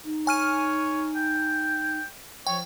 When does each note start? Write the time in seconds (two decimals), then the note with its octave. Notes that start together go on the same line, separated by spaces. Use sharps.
0.04 D#4
0.27 C#5 G#5 F6 D#7
1.15 G5
2.47 F3 C#5 G5